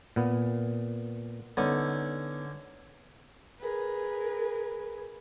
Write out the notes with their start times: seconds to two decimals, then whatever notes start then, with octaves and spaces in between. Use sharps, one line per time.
0.16 A#2 B3
1.57 D3 B3 C#4 D#4
3.60 G#4 A#4 B4